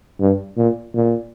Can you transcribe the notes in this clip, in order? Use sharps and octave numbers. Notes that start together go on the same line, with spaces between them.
G2
A#2
A#2